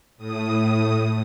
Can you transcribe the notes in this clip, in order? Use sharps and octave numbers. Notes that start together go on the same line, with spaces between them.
A2 D#6